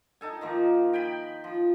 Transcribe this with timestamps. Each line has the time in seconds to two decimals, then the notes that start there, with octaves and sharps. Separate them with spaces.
0.21 D#4 A4 G#5
0.41 D#3 F3 A#3
0.93 G5 G#5 B5
1.44 F3